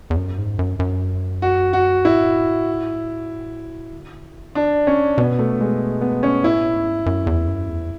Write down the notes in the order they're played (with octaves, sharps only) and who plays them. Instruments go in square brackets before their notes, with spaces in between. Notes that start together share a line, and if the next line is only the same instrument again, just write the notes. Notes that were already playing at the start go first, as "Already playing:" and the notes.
[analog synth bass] E2
F#2
G#2
F#2
F#2
[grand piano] F#4
F#4
[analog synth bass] A2 [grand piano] E4
[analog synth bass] D3
[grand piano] D4
C#4
[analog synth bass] B2 [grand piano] B3
[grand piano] A3
G#3
B3
C#4
[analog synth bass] A2 [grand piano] E4
[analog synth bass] G#2
F#2
E2
F#2
E2